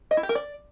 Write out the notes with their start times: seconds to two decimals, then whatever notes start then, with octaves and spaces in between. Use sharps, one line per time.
0.11 D#5
0.17 E4
0.23 G4
0.29 A#4
0.35 D5